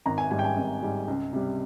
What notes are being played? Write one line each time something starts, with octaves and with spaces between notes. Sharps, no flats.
G#1 A#5
G#5
G#2 G3 G#5
G5
G#5
G#1
G#2 G3
C#2
C3 G3